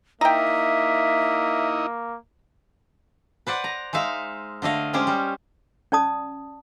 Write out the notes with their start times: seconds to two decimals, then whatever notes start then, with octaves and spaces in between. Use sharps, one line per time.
0.21 A#3 D#4 E4 D#5 E5 G5 A#5
3.47 B4 C5 D5 F#5
3.64 A#5
3.93 G#3 D#4 E5 F5
4.62 D3 A3 D#5 F5
4.93 G#3 C#4 G4 C5
5.07 G3
5.92 C#4 D5 A5 D#6